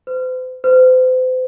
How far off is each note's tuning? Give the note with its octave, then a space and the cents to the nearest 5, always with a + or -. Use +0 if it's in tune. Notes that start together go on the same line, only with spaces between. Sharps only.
C5 -45
C5 -40